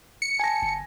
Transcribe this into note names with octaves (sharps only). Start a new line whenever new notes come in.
C#7
G#5 A5 A#6
G1